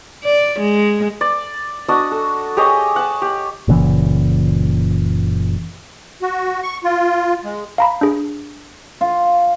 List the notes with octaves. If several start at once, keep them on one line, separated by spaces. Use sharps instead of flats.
D5
G#3
D5
D4 F#4 D#5
A4
G4 G#4 C#5 D#5
F#5 A5
G4
F#1 A#2 C#3 E3
F#4
C#6
F4
G#3
F5 A#5 B5
D4 G#4
F4